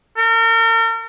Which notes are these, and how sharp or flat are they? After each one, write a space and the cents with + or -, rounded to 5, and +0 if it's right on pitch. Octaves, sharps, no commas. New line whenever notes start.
A#4 -40